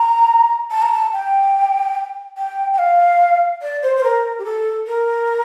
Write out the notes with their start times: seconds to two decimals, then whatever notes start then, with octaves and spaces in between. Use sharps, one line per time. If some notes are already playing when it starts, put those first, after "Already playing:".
Already playing: A#5
0.71 A5
0.82 A#5
0.92 A5
1.13 G5
2.37 G5
2.74 G5
2.78 F5
3.62 D5
3.83 C5
3.96 C5
4.04 A#4
4.38 G4
4.45 A4
4.87 A#4